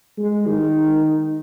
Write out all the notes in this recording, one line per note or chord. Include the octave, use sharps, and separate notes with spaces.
G#3
D#3